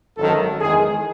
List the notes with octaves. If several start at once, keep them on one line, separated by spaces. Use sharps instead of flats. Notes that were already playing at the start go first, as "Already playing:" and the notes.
G#1 F#2 D#3 F#3 A4
E2 D#3 G#3 G#4